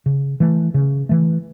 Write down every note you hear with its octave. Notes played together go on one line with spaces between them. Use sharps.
C#3
E3 A3
C#3
E3 A3